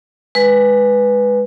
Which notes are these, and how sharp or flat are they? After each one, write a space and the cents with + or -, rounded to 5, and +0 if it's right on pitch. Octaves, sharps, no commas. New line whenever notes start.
G#3 +0 B4 +0